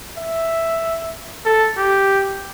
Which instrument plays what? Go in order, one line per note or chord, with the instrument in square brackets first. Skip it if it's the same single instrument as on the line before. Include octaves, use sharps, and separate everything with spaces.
[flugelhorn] E5
A4
G4